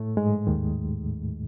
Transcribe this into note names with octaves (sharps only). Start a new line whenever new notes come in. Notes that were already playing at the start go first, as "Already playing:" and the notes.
Already playing: A2 A3
G#2 G#3
D#2 D#3